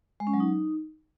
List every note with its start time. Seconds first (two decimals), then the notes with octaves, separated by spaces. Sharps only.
0.20 G#3
0.27 C#4
0.34 F#3
0.40 D#4